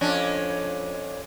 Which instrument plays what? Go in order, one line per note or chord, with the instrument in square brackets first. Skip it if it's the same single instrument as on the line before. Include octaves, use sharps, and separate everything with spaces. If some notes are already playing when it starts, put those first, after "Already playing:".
[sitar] F2 C#4 D4